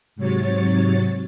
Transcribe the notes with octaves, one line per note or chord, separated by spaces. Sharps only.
G#2 C3 F#3 C#5 A6